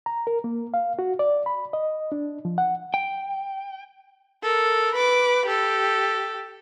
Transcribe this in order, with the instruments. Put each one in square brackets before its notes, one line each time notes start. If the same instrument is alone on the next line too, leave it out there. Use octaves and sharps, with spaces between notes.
[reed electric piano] A#5
A#4
A#3
F5
F#4
D5
B5
D#5
D4
F3
F#5
[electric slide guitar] G5
[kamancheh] A4 A#4
B4 D6
G4 A4